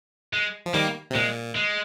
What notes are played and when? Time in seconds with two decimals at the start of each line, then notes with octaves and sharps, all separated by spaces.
0.33 G#3
0.66 F3
0.74 D#3 G3 A#3
1.11 C3
1.15 A#2 G#3
1.56 G#3